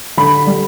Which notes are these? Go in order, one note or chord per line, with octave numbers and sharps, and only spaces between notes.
D3 B5
G3